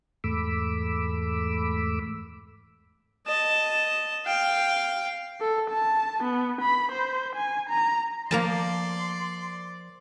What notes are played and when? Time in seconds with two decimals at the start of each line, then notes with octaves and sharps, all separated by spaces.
0.24 E2 G#2 A3 B5 D6 E6
3.26 D#5 A5
4.26 F5 G5
5.40 A4
5.70 A5
6.24 B3
6.61 B5
6.92 C5
7.36 G#5
7.70 A#5
8.31 F3 A#3 A#4 D5 A5 C6